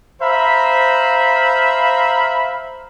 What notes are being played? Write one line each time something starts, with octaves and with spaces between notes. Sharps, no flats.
C5 E5 F5 A#5 B5